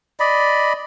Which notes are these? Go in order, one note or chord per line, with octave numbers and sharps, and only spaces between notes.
D5 D#5 B5